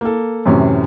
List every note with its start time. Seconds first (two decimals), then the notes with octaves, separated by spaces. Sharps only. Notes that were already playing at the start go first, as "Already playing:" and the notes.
0.01 A#3 A4
0.46 F#2 A2 C3 E3 C#4